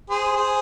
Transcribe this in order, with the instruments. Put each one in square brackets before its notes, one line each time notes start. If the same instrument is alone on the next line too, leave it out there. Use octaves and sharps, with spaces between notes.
[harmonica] G#4 C5
G#4 C5